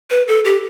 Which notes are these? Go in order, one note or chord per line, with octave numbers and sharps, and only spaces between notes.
B4
A4
G4